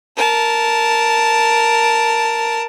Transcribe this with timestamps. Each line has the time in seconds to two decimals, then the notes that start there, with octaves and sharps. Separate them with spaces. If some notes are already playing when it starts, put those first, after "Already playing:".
0.16 A#4 A5